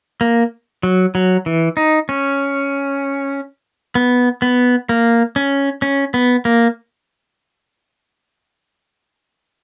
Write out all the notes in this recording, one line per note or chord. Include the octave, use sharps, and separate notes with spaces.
A#3
F#3
F#3
E3
D#4
C#4
B3
B3
A#3
C#4
C#4
B3
A#3